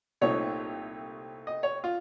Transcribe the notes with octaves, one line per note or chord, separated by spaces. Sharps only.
C2 A#2 A3 C4 D#4 C#5
D#5
C#5
F4